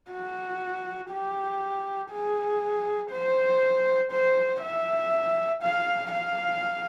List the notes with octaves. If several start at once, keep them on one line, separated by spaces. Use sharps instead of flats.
F#4
G4
G#4
C5
C5
E5
F5
F5